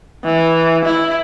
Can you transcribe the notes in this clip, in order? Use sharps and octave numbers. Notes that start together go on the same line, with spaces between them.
E3
E4